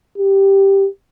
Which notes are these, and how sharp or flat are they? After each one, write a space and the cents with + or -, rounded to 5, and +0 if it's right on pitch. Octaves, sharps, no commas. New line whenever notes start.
G4 +0